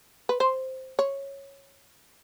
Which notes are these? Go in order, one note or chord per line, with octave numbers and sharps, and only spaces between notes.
B4
C5
C#5